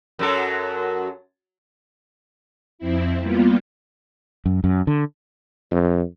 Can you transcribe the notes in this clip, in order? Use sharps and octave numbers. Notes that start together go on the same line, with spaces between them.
F#2 F#3 A4
F2 C4 E4
G3 A#3 B3 F4
F#2
F#2
D3
F2